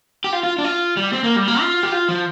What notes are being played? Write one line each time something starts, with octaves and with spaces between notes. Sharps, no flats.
G4
F4
F4
D4
F4
G3
C4
A#3
G3
A#3
F4
G4
F4
F3